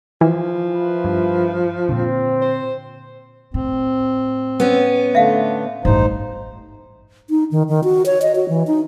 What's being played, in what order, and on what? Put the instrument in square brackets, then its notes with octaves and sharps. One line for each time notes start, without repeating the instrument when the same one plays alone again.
[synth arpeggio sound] E3 [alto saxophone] F3
[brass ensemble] E4 F4 B4
[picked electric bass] G2
[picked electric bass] A#2 D3 [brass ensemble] C4
[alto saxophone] C5
[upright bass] A2 [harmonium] C4
[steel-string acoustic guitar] B3 C#4
[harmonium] D3 A3 [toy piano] E5 F5
[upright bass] A1 G2 [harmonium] D#4 C5
[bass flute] D#4
D#3
D#3
F#4
C#5
D#5
F#4
E3
D#4